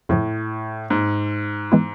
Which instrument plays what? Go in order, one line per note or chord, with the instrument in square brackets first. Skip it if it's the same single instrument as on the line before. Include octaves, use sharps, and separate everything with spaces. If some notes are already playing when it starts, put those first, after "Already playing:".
[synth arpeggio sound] F2 C#3 F3 [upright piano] A2
[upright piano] G#2
[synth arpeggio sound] E3 G#3 B3 E4